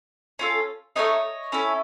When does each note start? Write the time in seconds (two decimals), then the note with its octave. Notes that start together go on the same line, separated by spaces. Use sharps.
0.39 C#4 F4 A4
0.96 A3 C4 D#4 C#5 D#5
1.52 C#4 E4 A4